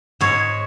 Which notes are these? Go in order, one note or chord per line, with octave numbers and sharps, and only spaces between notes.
G#2 C#5